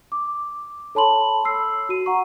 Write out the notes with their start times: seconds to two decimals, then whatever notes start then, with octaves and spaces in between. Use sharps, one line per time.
0.12 D6
0.95 A4 C#5 A5 B5 C6 F#7
1.45 E6 C7
1.89 F#4 D#7
2.06 F#5 A#5 C#6